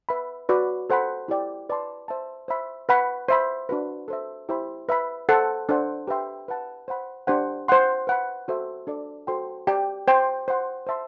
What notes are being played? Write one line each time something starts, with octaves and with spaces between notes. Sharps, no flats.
B4 E5 B5
F#4 B4 D5
A4 C5 F#5 B5
E4 G4 D5 G5
B4 D5 A5 C6
C5 E5 A5
C5 E5 B5
B4 F#5 B5
C5 E5 B5
D4 F#4 B4
A4 C5 E5
E4 G4 C5 E5 B5
B4 E5 B5
A4 C5 F#5 A5
D4 A4 C5 F#5
G4 B4 E5 G5 C6
B4 F#5 A5
C5 F#5 B5
D4 G4 C5 F#5
C5 F#5 C6
B4 F#5 B5
F#4 A4 C5 E5
D4 A4 D5
F#4 A4 C5 G5 C6
G4 D5 G5
C5 G5 C6
C5 F#5 C6
C5 E5 A5 C6